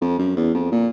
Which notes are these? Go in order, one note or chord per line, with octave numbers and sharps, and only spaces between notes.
F2
F#2
E2
F2
A#2